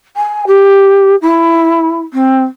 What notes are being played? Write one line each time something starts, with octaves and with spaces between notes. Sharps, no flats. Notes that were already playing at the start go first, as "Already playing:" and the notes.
G#5
G4
E4
C4